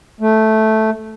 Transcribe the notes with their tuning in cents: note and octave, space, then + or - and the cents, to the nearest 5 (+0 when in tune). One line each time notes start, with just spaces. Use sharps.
A3 -5